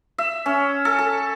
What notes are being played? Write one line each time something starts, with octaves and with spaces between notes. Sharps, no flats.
E5
C#4
A4
A4